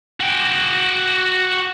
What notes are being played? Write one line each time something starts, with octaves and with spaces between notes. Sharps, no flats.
F#4 G5